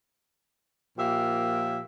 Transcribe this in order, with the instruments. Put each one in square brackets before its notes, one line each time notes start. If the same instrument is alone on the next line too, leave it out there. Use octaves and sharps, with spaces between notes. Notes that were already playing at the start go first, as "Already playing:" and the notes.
[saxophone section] A#2 F3 A#3 G4 E5